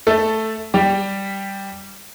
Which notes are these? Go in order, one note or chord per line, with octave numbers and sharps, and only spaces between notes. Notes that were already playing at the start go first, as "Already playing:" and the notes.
A3 A4
G3 G4